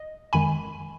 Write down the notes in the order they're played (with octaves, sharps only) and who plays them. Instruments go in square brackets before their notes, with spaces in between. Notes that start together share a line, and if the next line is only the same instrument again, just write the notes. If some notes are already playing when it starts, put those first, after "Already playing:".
Already playing: [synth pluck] D#5
F#2 D#3 G#3 G#5 B5